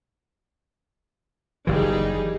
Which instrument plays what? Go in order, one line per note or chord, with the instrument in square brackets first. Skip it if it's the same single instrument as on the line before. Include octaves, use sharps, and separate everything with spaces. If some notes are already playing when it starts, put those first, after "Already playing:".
[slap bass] F#1 E3 [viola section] G3 D#4 G#4